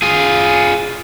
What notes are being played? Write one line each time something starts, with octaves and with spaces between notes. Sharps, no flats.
F4 G#4